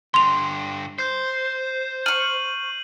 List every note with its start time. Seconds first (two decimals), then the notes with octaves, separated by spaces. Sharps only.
0.14 G2 D3 C6 F7
0.98 C5 G6 C7
2.06 C#6 F6 D#7 F#7